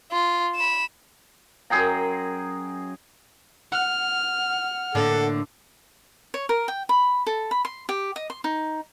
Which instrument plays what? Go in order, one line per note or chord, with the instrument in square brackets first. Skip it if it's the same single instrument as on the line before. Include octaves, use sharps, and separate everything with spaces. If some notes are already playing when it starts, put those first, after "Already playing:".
[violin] F4
B5 E7
[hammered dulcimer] F#2 G#4 G5 A#5
[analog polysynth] F#5 [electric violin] F6
[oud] A2 D3 A#3 [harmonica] A4
[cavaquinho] C#5
A#4
G5
B5
A4
B5
C6
G4
D#5
C6
D#4